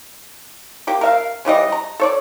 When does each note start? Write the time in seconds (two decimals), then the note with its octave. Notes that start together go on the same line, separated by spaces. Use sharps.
0.87 A#3 G4
1.01 A#4 E5 F5
1.45 C#3 E3 G3 D#5
1.72 A#5
2.00 A4 C#5 D5